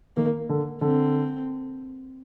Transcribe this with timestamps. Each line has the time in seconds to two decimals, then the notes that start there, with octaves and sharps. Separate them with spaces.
0.17 D#3 A#3
0.49 D3
0.81 D3 C4